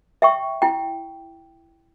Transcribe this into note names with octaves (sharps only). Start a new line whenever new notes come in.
E5 G5 C#6
E4 G5